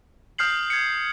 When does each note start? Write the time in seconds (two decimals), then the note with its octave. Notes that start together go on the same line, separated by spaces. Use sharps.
0.38 D#6 F6 G6 C7 F#7
0.70 G#6 C#7